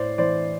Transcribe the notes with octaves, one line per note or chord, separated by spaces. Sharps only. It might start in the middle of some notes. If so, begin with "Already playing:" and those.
Already playing: A2 C5 D5
E3 C5 D5